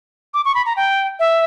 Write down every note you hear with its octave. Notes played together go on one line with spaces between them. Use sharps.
D6
C#6
B5
A#5
G5
E5